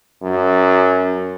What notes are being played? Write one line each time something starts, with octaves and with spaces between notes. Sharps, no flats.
F#2